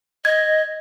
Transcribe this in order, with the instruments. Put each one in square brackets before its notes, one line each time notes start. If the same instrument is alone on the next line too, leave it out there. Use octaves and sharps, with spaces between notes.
[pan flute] D#5 [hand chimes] G#6